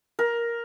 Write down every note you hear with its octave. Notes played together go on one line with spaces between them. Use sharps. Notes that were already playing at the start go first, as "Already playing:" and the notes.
A#4